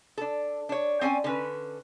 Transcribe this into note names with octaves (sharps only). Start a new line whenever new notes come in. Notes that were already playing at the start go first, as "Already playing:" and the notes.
D4 A4
D4 C#5
C4 C#4 D5 G5 G#5
D3 C#4 B4